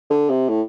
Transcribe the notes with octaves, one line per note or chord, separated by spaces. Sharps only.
D3
C3
A2